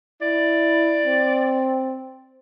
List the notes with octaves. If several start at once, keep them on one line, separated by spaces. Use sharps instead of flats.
E4 D5
C4